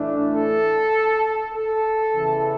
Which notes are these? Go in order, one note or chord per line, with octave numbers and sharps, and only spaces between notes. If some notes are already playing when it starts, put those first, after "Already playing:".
Already playing: A2 E3 A3 D4
A4
A4
E2 C#3 E3